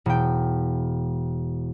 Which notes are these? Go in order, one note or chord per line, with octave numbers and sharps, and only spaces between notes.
E1 G5